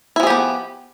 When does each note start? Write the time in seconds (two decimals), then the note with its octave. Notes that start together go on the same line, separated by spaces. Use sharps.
0.16 E4
0.20 F3
0.23 G#4
0.27 G4
0.30 B3